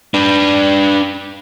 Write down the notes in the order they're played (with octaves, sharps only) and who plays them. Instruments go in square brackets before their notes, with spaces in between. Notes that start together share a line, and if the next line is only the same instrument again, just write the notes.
[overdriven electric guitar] D4 B4